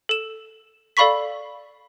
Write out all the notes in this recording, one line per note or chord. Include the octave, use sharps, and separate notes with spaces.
A4 E7
A4 D5 F5 B5 C#6 B6